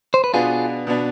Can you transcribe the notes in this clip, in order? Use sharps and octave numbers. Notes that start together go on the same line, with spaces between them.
C5
B4
B2 B3 D4 F4 G#4
B2 B3 D4